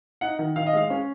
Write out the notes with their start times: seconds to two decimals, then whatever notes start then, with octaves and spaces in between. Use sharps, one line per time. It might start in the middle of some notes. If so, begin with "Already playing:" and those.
0.21 D#4 F#5
0.39 D#3
0.56 D#3 F5
0.66 D#5
0.73 G#3 F5
0.90 C#4